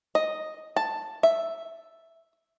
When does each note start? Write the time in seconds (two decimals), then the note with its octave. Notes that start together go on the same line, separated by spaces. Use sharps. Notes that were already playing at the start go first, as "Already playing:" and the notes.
0.15 D#5
0.76 A5
1.23 E5